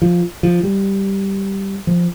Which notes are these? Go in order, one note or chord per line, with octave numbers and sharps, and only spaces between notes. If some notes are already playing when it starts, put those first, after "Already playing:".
F3
F3
G3
F3